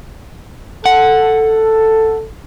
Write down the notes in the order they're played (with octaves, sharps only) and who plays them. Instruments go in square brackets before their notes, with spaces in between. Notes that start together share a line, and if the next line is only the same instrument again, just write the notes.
[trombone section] A4 [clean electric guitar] F#5